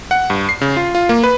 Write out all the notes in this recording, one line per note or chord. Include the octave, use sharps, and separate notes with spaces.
F#5
G2
C7
C#3
F4
F4
A#3
B4